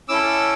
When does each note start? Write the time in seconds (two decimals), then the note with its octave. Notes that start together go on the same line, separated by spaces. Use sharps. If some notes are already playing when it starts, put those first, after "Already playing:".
0.09 C#4 E4 A4 D6 E6